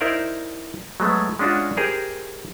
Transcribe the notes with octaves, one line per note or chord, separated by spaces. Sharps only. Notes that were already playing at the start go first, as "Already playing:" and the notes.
D#4 E4 A#4 C5 D5
F#3 G#3 A3 B3
G#3 C#4 D4 F4 F#4
G4 G#4 A#4 C5